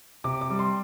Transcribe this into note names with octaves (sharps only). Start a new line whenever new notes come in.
C3 D6
D6
G3
C6